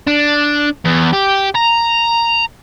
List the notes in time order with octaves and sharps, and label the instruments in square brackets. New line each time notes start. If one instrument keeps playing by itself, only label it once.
[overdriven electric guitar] D4
E2
G4
A#5